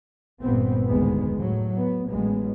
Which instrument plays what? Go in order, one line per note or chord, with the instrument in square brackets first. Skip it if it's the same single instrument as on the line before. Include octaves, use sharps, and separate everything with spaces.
[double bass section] G1 G2 A#2 B3 C4
F1 D2 A2 D#3 G#3 B3
A2 F#3
B3
A1 F#3 G#3 B3